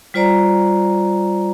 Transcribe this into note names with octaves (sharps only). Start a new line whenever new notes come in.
G3 F4 C5 D5 A#5